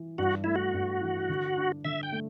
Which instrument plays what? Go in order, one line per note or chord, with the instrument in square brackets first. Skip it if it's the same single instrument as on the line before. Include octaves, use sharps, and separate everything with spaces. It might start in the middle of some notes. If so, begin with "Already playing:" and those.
Already playing: [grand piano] E3
[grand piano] G2 [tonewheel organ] F#4
[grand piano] A3 [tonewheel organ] E4
[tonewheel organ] F#4
[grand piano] G2
E3
D3
D4
[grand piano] D3 [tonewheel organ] E5
[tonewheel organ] G5
[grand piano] A3